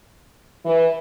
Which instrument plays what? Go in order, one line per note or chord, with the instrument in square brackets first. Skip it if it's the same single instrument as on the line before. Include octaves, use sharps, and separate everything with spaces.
[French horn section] E3